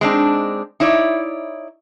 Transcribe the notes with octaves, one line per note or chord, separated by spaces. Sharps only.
G#3 C4 D4 D#4
D#4 E4 C#5 D5